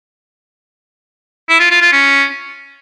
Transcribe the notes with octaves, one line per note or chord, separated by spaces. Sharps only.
E4
F4
F4
F4
C#4